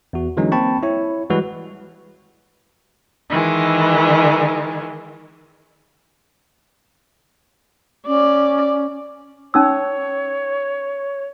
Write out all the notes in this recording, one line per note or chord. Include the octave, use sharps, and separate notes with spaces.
E2 F#4
D3 E3 F#3 G#3 C#4 D#4
A#3 C4 G5 A5 B5 C#6
E4 C#5
E3 G3 G#3 F#4 B4
D#3 E3 G#3
C#4 D5
C#4 D#4 C#5 E6